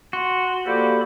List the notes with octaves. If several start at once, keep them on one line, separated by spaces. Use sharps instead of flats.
F#4 C6
F3 A#3 G4 A4 D5 B5